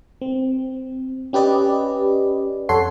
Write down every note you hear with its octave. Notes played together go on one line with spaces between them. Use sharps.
C4
C#4 G4 B4 D5 D#5
F2 A4 C#5 F#5 C6 C7